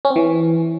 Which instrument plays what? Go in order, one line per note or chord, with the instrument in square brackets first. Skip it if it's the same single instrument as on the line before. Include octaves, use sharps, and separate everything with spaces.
[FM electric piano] C#4
C4
E3